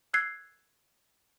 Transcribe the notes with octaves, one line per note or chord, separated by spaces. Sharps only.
E6 F#6 G#6 C7